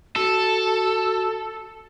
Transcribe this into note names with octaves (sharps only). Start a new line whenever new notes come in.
F#4 A4